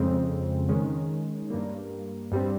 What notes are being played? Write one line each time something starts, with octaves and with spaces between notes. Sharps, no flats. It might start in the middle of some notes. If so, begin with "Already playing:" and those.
Already playing: F2 C#3 G#3 C4
D#3 G#3 C#4
G2 G3 A#3
G2 G3 C4